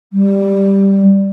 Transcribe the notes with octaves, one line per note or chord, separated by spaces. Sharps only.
G3